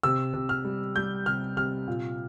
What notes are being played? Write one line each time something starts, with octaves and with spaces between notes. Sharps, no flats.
C3 E6
C3
F6
G3
G3 G6
C3 F6
C3 F6
A#2